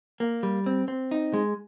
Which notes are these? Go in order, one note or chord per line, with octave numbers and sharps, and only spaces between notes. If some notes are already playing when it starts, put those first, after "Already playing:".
A#3
G3
C4
C4
D#4
G#3